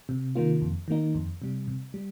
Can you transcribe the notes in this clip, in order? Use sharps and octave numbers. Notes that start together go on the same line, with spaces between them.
C3
D#3 A#3 F4
F2
D#3 A#3 D#4
F2
C3 G3
C3
G3